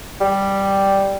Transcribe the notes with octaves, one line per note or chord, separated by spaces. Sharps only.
G3